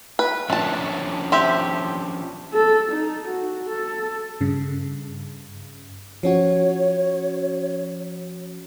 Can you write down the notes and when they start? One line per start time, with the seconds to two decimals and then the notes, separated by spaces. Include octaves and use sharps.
0.19 B4
0.50 F3 A3 C#4 D4 A5
1.32 C4 G4 E5
2.53 A4
2.91 D#4
3.27 F#4
3.69 A4
4.41 G2 C#3
6.23 F3 C#4 F#4 C#5